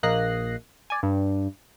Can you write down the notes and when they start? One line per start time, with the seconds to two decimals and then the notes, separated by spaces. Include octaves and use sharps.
0.03 A#1 A#3 D#5 F#6 A#6 C7
0.90 D5 G#5
1.03 G2